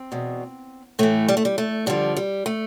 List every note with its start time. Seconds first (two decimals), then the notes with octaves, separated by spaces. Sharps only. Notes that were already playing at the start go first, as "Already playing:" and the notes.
Already playing: C4
0.12 E2 B2
0.99 A2 E3 A3
1.28 G3
1.37 A3
1.45 G3
1.58 A3
1.86 G2 D3 F3 G3
2.16 G3
2.46 A3